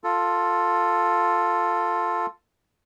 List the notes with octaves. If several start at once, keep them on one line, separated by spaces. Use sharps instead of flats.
F4 A4